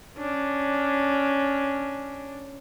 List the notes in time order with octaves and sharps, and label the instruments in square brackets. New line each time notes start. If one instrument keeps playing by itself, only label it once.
[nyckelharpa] C#4 D4